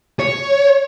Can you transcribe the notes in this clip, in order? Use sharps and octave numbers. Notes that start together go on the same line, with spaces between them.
C#5